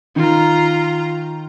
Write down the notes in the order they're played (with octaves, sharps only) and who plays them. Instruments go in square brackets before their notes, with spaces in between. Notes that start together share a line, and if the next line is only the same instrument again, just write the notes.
[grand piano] D#3 [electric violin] F4 A#5